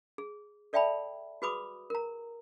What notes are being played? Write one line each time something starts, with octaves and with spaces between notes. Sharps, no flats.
G#4
A4 D5 E5 G5 A5 B5
F#4 G#4 B4 B5 D6 D#6
A#4 A#5